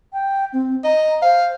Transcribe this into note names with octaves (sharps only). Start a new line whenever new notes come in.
G5
C4
D#5 A#5
C5 F5